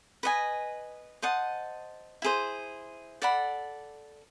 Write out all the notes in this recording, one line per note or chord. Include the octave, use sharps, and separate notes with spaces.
B4 D#5 G#5
C5 D#5 F#5 A5
E4 G#4 C5
A4 D5 F#5 B5